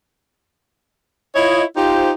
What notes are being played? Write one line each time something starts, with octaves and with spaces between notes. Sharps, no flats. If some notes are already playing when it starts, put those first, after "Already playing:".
E4 F4 C#5 D#5
D#4 F4 G4 C5